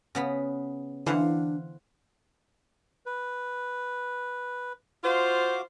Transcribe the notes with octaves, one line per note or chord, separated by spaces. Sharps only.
C#3 B3 B5
D3 E3 D4 C5 F5 F#5
B4
F4 F#4 C5 F5 D6